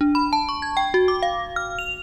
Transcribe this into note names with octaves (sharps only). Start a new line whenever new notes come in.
D4
B5
A5
C#6
G#6
G5
F#4
D6
F5
F6
F7